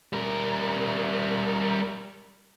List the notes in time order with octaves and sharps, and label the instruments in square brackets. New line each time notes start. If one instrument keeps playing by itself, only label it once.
[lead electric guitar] G3 A#4